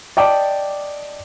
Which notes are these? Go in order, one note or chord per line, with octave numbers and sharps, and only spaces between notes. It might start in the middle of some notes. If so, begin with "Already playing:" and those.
D5 D#5 G5 A5 D6